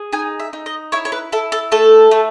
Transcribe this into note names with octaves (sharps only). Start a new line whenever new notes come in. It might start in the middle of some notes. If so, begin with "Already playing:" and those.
Already playing: G#4
D#4 G#5
E5
D#4
D#5
E4 C#5
C#5
B4
E4 A4
A4
A3 A4
A3